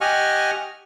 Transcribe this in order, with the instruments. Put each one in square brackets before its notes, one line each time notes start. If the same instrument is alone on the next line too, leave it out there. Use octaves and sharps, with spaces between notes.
[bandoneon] G4 D#5 F#5 G#5 C#6 F6